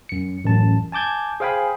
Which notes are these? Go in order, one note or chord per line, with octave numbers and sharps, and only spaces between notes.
F#2 C#7
A1 F#2 A5
G#5 A5 D6 G6 G#6
G#4 C5 F5 G5 G#5 B5